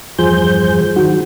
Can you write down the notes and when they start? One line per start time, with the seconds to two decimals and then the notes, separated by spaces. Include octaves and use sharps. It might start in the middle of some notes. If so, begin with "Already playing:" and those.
0.19 E2 G2 F3 G#4 C5 G6
0.96 D#3 F#3 F#4